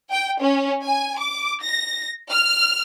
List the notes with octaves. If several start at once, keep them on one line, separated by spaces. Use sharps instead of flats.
G5
C#4
G#5
D6
A#6
F6